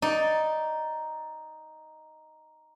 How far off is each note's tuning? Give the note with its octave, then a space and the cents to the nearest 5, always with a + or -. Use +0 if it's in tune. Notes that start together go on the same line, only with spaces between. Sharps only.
D#4 +0 D5 +0